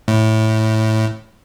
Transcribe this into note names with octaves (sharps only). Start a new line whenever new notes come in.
A2